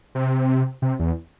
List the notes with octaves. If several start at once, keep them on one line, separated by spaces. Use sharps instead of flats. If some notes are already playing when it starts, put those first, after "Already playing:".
C3
C3
E2